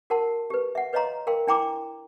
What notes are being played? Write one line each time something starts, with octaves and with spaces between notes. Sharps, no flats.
F#4 A#4 F#5 A5 C6
G4 B4
E5 F#5
B4 C#5 D#5 F5 A#5 C6
A#4 F5 G5 C6
D4 E4 G5 A#5 C6 D6